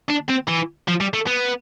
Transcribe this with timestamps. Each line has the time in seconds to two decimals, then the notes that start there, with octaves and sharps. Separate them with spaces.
0.10 D4
0.30 C4
0.48 E3
0.88 F3
1.01 G3
1.14 A3
1.27 B3